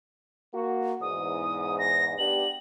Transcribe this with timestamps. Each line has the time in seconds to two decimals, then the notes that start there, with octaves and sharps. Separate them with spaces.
0.54 A#3 F#4
1.01 E2 G#2 D#6
1.79 A#6
2.19 B3 D4 G4 F#7